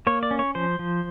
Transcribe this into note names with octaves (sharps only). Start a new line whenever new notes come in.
A#3 C#5
D5
C#4
C#5
F3 C5
F3